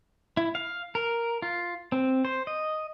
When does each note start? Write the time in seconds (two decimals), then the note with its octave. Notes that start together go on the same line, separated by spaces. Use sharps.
0.37 E4
0.55 F5
0.95 A#4
1.42 F4
1.92 C4
2.25 C5
2.47 D#5